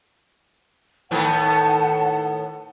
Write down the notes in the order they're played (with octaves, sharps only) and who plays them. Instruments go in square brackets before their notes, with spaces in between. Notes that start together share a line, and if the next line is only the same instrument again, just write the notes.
[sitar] A2 D#3 B3 [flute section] F#5 A5